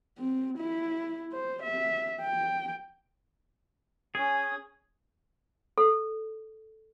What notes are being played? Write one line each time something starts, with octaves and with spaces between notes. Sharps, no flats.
C4
E4
C5
E5
G5
C#4 G#4 D#6
A4